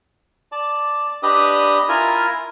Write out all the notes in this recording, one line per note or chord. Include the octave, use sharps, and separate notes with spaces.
D5 A5
D4 G4 B4 D5 D#5 D#6
E4 F4 A#4 G#5